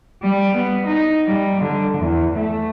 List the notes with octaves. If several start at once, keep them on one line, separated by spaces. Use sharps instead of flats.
G3
B3
D#4
G3
D3
E2
A3